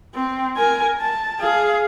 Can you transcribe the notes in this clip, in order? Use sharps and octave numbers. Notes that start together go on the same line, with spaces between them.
C4
A#4 G#5
A5
G#4 F5